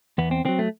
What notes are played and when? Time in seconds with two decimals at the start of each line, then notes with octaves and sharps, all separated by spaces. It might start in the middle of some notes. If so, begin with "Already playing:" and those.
0.18 E2 B3
0.31 C4
0.45 D#3 F#3 C4
0.59 A3